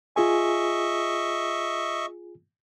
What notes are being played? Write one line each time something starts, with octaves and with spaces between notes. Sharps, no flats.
F4 G#4 D#5 E5 G#5 C#6